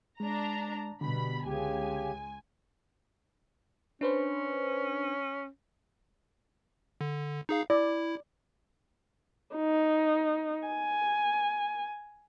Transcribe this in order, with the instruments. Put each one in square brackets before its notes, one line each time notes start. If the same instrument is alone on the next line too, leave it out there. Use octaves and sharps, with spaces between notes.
[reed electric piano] G#3 [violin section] D4 A#5
[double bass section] B2 G3 B3 [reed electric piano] D3 [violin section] B5
[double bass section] C#2 G#3 [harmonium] C#3 G4 [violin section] G#5
[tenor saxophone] C#4 [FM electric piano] D4 B4 C5
[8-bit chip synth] D3
D#4 G#4 F5
[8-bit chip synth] E4 [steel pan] D5
[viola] D#4
G#5